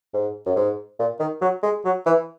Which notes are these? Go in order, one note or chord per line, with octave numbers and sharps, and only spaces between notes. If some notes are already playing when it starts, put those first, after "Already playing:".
G#2
F#2
G#2
A#2
D#3
F#3
G#3
F#3
E3